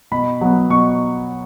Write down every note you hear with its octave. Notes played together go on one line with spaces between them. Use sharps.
B2 B5
F#3 B3
B2 C#6